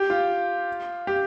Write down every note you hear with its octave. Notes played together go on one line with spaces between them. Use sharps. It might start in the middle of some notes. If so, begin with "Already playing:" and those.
Already playing: G4
F4
G4